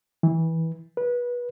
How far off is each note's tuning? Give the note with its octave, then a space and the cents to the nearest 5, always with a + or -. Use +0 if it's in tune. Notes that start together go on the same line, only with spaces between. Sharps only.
E3 -20
B4 -25